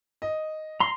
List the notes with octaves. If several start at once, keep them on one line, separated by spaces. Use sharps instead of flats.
D#5
A#5 C6